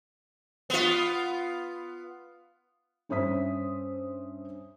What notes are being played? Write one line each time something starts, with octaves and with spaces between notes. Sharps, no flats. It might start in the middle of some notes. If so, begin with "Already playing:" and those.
B3 F4
G2 C#4 C5 E5 D#6 B6